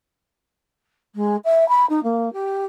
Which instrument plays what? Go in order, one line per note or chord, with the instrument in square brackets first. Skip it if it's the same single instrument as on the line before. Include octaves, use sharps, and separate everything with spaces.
[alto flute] G#3
E5
B5
D#4
A#3
G4